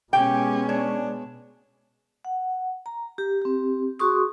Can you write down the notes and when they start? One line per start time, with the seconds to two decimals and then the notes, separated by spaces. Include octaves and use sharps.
0.13 B2 G#3 C#4 G4 G5
0.69 D4 C#5
2.25 F#5
2.86 A#5
3.18 G4
3.42 C4 G4
3.99 F#4 G#4 C6 C#6 D#6